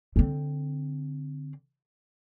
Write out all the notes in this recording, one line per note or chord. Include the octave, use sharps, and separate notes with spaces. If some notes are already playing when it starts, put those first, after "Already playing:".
D3 C4